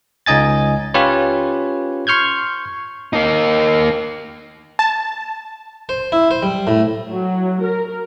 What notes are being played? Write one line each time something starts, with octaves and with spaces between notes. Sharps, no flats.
C#2 D#4 D#5 G#5 A6
C#4 F4 G4 B4 C#5
C6 C#6 F6 G6 G#6
A#3 D#4
A5
C5
E4
C5
G3
A2
F#3
A#4